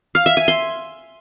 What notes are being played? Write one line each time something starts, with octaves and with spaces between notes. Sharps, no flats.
F5
E5
G#5
C6